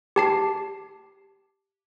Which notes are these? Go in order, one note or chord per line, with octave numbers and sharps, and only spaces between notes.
G4 A5 C7